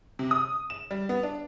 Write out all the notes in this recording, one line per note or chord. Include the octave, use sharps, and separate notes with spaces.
C3
D#6
E7
G3
B3
D4